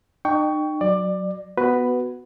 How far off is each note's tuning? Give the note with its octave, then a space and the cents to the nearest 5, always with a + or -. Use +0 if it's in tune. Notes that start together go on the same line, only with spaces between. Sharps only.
D#4 -40 G5 +0 C#6 +20
F#3 +0 D5 +20
B3 +0 F#4 +0 B4 +5